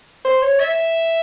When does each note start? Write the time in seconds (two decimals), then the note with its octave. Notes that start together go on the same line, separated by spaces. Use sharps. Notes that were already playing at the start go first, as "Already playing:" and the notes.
0.25 C5
0.42 C#5
0.60 E5